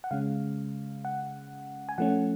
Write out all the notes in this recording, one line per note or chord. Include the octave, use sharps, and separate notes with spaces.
F#5
C#3 G#3 C#4 F5
F#5
G#5
F3 A3 C#4 F#5